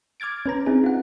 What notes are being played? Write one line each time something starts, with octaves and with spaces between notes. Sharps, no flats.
D6 F6 G#6 A6 D7
C#4 B4 A#5
C4 D#4 E4 G#4
F4 F#5